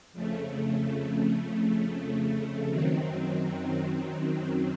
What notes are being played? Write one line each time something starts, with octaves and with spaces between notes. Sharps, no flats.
F2 C#3 A3
F#2 D#3 F#3 C4